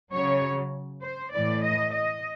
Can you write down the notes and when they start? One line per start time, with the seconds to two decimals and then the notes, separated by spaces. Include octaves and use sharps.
0.13 C#3 F#3 C#5
1.02 C5
1.32 A2 E3 D5
1.63 D#5
1.93 D#5